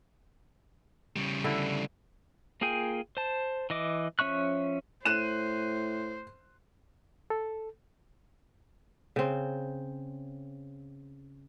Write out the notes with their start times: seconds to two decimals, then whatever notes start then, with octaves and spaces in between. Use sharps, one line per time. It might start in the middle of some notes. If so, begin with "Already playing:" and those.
1.16 C#3 G3
1.44 D3 E4
2.61 A#3 F4 G#4 G5 G#5
3.17 C5 A5
3.70 E3 D#5 D6
4.19 F3 C#4 E5 C#6 F#6
5.05 A2 C5 F#6 D#7 E7
7.30 A4
9.16 C#3 C4